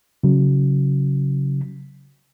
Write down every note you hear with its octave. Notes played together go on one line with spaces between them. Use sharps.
C#3 F#3